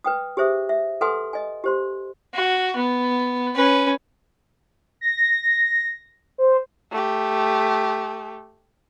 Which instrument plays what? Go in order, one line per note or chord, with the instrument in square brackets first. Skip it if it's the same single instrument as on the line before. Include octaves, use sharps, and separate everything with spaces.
[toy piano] B4 G5 D#6
G4 G#4 C5 E5 D#6
E5
A4 B4 F#5 G#5 C6 D#6
D#5 G#5
G4 C5 C6
[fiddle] F#4
B3
C#4 B4
[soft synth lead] A#6
C5
[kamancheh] A3 G4